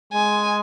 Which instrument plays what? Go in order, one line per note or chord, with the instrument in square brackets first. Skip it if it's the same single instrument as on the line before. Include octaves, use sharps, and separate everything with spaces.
[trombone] G#3 [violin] G#5